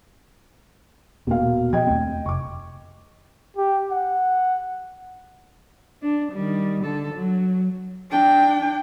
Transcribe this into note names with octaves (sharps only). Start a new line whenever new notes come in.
D#1 B2 A#3 F5
F3 D#5 G5 G#6
D#2 A3 C4
F1 C#6 D6
G4
F#5
D4
D#3 G3
D3 A4
F#3
D4 G5